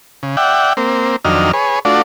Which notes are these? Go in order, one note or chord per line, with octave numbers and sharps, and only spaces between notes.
C#3
D5 E5 F#5 G5
A#3 C4
F2 D#3 F#3 D4 D#5 F6
G#4 B4 C#5
A3 D4 F4 F#4 D5